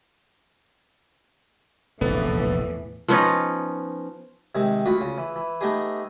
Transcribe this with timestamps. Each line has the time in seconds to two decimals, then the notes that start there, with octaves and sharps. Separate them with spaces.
2.01 F1 A#1 E2 A2 E3 B3 A4
3.08 F3 B3 C#4 D#4
4.55 C3 D#3 G#3 C4
4.86 D2 F4 F#4 B5
5.01 C#3
5.18 E3
5.36 E3
5.61 A3 B3 D#4 G4 G#4